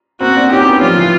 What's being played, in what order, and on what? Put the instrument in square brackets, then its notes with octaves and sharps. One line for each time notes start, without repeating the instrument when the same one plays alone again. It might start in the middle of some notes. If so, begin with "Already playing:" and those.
[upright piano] A#3 C4 [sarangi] F#4
[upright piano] C4 D4
[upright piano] C#4 D#4 [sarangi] G4
[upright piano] B3 C#4
[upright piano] F3 G3 [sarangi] F4
[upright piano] E3